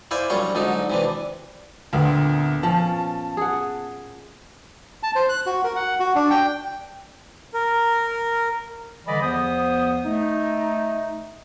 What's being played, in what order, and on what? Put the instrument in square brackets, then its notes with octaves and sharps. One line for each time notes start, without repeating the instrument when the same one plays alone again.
[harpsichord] E4 C5 D5 F5 G#5
A#1 F#2 G3 F4 C#5
G#2 D3 F#3 D#4
C3 E3 D4
[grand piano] D2 [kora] A#2 B3 C4
[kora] F3 C#4 [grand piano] A5
[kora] G#4 F#5
[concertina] A5
C5
F#6
F#4
A#4
F#5
F#4
D4
G5
[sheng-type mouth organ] A#4
[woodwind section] D3 E3 G3 D5 D#5 B5
E2 F3 B3 C5 D#6
A3 D#4